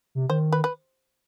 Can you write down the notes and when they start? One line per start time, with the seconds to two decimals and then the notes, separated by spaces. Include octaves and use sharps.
0.15 C3
0.30 D#3 C5
0.53 B4
0.64 B4